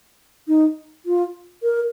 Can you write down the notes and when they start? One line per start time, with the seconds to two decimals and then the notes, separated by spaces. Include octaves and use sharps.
0.48 D#4
1.06 F4
1.63 A#4